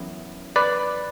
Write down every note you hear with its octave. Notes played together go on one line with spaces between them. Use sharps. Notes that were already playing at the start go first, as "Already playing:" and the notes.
Already playing: F#2 E3 B3
B4 D5